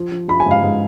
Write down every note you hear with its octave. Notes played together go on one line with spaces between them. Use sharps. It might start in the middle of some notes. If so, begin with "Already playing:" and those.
Already playing: F3
F3
F3 B5
G#5
G#2 F5
G#2